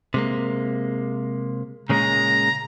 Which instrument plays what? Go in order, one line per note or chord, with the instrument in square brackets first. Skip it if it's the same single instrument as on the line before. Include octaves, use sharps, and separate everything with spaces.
[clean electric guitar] C3 G#3 A#3
[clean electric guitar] A#2 C#3 G#3 [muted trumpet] A#5